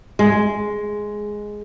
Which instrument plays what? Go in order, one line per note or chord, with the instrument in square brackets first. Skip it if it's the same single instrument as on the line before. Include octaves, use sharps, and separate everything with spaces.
[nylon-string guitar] G#3